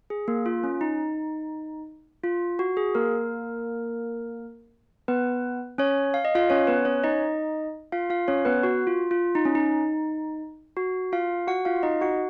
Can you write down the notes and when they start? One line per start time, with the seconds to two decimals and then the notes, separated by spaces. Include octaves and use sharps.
0.10 G#4
0.28 A#3 A#4
0.46 F4
0.64 C#4
0.81 D#4
2.24 F4
2.59 F#4
2.77 G#4
2.95 A#3 A#4
5.08 B3 B4
5.78 C#4 C#5
6.14 F5
6.25 D#5
6.35 F4 F5
6.50 C#4 C#5
6.67 B3 B4
6.85 C#4 C#5
7.03 D#4 D#5
7.92 F4 F5
8.10 F4 F5
8.28 C#4 C#5
8.45 B3 B4
8.63 F#4
8.87 F4
9.11 F4
9.35 D#4
9.45 C#4
9.55 D#4
10.77 F#4
11.13 F4 F5
11.47 F#4 F#5
11.65 F4 F5
11.83 D#4 D#5
12.01 F#4 F#5